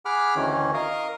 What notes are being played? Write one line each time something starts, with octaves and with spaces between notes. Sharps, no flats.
G#4 F#5 B5 D6 F6
D2 D#3 E3 C#4
A#4 D#5 F5